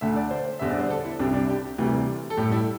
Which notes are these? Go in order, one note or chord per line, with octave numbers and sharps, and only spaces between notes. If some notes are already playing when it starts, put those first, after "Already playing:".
D2 D3 A3 E5
D5
C5
E2 D3 G3 E5
D5
C5
A4
E4
C2 C3 G3 D4
D4
G4
D2 C3 E3 G3
A4
A2 G3 G4
E4